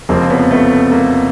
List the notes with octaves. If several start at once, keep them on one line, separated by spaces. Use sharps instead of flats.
F1 F2 C#3 F3 A#3 C4
B3 C#4
A3 B3
A#3